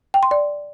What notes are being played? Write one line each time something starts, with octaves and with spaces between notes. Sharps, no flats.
G5
C6
D5